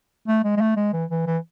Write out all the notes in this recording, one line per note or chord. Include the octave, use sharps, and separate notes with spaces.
A3
G#3
G#3
A3
G#3
E3
E3
E3